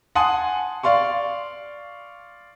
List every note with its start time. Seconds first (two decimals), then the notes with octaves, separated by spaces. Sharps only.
0.15 F#5 G#5 A5 C6 D#6
0.83 D5 F5 C6 C#6